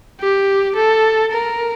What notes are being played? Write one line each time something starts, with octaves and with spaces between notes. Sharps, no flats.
G4
A4
A#4